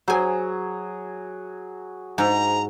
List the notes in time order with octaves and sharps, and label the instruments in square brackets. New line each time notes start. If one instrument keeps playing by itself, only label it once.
[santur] F#3 G#4 [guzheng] C5 G#5
[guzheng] G#2 [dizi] A#5